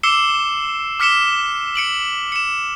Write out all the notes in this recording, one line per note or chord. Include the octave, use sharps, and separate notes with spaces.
D6 E6 C7 C#7 E7 G7
D6 F6 B6 C#7 E7 G7
C#7 D7 F#7
C#7 E7